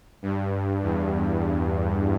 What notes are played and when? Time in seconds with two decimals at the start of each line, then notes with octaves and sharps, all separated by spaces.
0.22 G2
0.82 E2